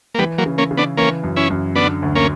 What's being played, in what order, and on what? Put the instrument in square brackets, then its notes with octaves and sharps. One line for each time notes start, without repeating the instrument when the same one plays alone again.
[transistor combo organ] A#3
[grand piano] E3 [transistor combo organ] G3 B3
[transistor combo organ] F#3 A#3
[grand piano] C#3
[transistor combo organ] A#3 C#4
[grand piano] C#3
[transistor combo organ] B3 D4
[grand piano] E3 [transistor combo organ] A#3 C#4
[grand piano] F#2
[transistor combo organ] C#4 E4
[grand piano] F#2
[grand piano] D3 [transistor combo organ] B3 D4
[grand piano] D2
[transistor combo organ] A#3 C#4